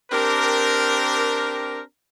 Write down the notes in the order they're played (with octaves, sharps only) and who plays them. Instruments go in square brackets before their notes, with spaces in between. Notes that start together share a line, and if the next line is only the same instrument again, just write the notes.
[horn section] C4 D4 G4 A#4